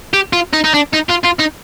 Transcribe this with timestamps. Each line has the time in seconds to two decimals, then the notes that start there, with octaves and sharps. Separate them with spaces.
0.14 G4
0.33 F4
0.53 D#4
0.64 D#4
0.74 D4
0.93 D#4
1.09 F4
1.24 F4
1.39 D#4